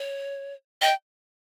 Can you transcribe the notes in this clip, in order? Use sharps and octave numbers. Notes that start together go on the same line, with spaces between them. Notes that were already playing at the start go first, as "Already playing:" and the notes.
Already playing: C#5
D#5 G5